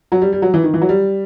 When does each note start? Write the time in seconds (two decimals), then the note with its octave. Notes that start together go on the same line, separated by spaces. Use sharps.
0.12 F#3
0.22 G3
0.33 G3
0.42 F#3
0.54 E3
0.64 D#3
0.74 E3
0.81 F#3
0.89 G3